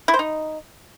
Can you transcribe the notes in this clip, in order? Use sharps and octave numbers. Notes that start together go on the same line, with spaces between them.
E4
C5
D#4